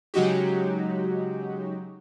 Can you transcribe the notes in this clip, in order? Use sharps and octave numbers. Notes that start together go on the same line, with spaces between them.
C#3 F#3 G#3 D#4 F#4 G4